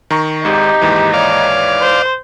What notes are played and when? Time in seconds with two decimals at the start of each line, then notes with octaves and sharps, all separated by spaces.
0.10 D#3 A#5 C#6
0.45 G#1 G#2 D#4 G4
0.82 D#2 G#2 E3
1.13 C#5 D5 F5
1.81 C5